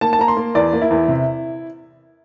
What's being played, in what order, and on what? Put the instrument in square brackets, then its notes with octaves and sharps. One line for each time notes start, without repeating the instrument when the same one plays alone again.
[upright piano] A#3 A5
A5
A#3 A#5
C6
A#3
E2 D5
A#3
E4
E2
C3